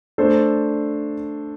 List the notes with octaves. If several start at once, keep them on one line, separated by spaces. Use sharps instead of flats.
A3 D4 A4 C5